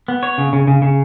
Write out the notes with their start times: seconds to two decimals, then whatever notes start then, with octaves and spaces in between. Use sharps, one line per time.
0.08 B3
0.23 C#5
0.38 C#3
0.53 C#3
0.67 C#3
0.82 C#3